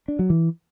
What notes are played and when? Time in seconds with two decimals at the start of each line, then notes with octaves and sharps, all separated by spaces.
0.08 D4
0.19 F#3
0.30 E3